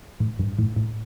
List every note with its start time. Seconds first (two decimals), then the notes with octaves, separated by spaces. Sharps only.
0.20 A2
0.39 G2
0.59 A2
0.76 A2